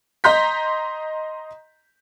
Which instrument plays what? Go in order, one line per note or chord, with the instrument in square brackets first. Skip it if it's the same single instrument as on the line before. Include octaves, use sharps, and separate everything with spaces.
[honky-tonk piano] D#5 A#5 C6 G6 B6